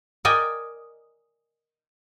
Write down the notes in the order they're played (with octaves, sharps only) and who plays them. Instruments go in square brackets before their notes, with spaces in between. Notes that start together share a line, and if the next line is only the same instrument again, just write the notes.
[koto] A#4 D5 D#5 G5 G#5